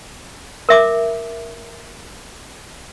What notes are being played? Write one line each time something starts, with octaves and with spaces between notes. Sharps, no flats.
A#4 E5 D6